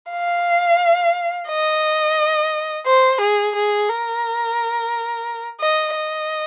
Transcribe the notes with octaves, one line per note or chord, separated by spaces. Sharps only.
F5
D#5
C5
G#4
G#4
A#4
D#5
D#5